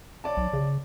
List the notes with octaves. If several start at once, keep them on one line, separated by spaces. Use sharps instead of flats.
C#5 D5 A5
B1
C#3